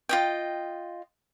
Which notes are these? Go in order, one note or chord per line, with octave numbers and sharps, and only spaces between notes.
F4 D#5 G5